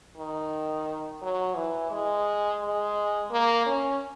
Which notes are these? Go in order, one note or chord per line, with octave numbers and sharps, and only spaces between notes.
D#3
F#3
E3
G#3
G#3
A#3
C#4